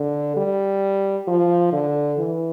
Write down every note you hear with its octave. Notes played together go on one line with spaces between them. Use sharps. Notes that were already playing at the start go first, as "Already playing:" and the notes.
Already playing: D3
G3
F3
D3
E3